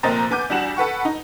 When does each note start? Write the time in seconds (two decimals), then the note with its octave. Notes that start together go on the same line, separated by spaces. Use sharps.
0.03 F1 A#2 C4 D#5 A#5 A6
0.31 B3 G#5 D6 G6
0.50 E2 G3 D4 F#4 E7 F#7
0.76 A4 B4 F#5 C#6
1.05 D#4